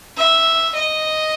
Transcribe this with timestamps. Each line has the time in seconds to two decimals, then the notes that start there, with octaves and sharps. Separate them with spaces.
0.17 E5
0.75 D#5